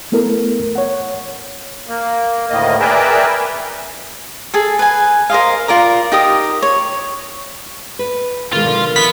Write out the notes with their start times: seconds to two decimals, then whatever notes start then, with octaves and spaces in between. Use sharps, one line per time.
0.12 A3 B3 E4 A4 A#4
0.75 C#5 F#5
1.88 A#3
2.50 D2 A2 D#3 A#3 D#5
2.80 G#4 A#4 B4 D5 E5 G5
4.54 G#4 A4
4.79 B4 G#5
5.30 A#4 C5 D#5 F5
5.68 F4 A#4 D5 A#5
6.12 D#4 G4 A#4 D#6
6.62 C#5
7.99 B4
8.53 B2 D#3 G#3 A#3 E4 F4
8.64 B2 D3 F3 C5 D5
8.96 B3 E4 B4 B6